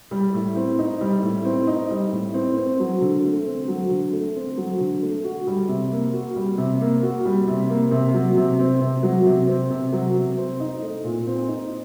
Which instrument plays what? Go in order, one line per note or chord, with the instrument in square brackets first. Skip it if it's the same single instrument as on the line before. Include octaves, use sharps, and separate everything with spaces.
[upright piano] G3
A2
C4
D#4
G3
A2
C4
D#4
G3
A2
C4
C4
F#3
D3
A3
C4
F#3
D3
A3
C4
F#3
D3
A3
F#4
G3
C3
A#3
F#4
G3
C3
A#3
F#4
G3
C3
A#3
C3
F#3
C3
C4
C3
F#3
C3
C4
C3
F#3
C3
C4
D#4
A3
A#2
C4
D#4